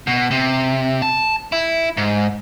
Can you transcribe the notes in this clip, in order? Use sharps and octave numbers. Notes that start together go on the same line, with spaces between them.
B2
C3
A5
E4
G#2